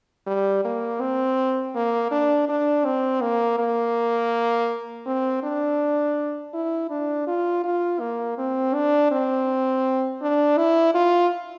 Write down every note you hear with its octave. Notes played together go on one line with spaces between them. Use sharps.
G3
A#3
C4
A#3
D4
D4
C4
A#3
A#3
C4
D4
E4
D4
F4
F4
A#3
C4
D4
C4
D4
E4
F4